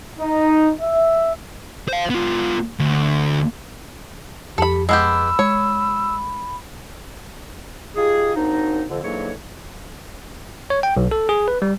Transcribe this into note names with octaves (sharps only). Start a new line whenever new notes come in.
D#4
E5
C5 F5
B3 F4
D2
F2 G4 A4 B5
G#3 B3 G4 B5 E6
G#3 C#5
D#4 F4 G4 G#4
F#3 A#3 C4 D4 D#4
F2 D3
G#2 D3 E3 F#3 A#3 C#5
C#5
G5
B1
A4
G#4
B4
G3